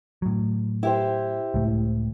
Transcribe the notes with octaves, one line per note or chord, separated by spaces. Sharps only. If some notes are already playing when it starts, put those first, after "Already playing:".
A2 F#3
E4 G4 C5
C#2 A2